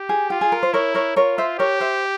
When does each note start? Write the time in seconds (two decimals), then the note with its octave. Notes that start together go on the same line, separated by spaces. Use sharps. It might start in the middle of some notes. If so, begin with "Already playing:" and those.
Already playing: G4
0.09 G#4
0.30 F4 G4
0.41 G#4
0.52 A#4
0.63 C5
0.73 E4 A#4 C#5
0.95 A#4 C#5
1.16 F4 A#4 C#5
1.38 C5 E5
1.59 G4 A#4 C#5
1.81 C5 E5